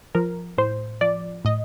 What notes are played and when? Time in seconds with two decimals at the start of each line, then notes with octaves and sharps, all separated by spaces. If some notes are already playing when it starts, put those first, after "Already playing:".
0.15 F3 A#4
0.58 A2 C5
1.01 F3 D5
1.45 A2 D#5